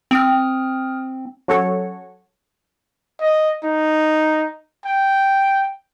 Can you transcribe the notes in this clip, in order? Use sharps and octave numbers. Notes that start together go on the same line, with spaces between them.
C4 G5 D#6 F6
F#3 C#4 F#4 A4 C#5
D#5
D#4
G5